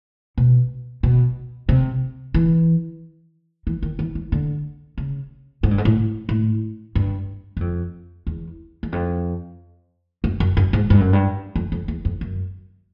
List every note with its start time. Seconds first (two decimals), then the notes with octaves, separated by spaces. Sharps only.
0.38 B2
1.03 B2
1.69 C3
2.34 E3
3.67 E3
3.82 D#3
3.99 E3
4.15 E3
4.32 D3
4.98 C#3
5.63 G#2
5.71 G2
5.78 G#2
5.85 A2
6.29 A2
6.95 G2
7.57 F#2
7.61 F2
8.27 E2
8.83 E2
8.92 F2
10.24 F#2
10.40 F#2
10.57 F#2
10.73 G#2
10.90 G2
11.01 F#2
11.13 G2
11.56 F2
11.72 F2
11.88 E2
12.05 F2
12.21 F#2